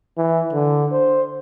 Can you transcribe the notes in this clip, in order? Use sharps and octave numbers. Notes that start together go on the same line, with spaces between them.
E3
D3
C5